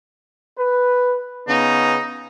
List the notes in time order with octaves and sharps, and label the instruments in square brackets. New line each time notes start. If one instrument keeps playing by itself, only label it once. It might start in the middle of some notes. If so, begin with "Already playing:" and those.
[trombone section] B4
[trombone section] C#3 B3 [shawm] D#4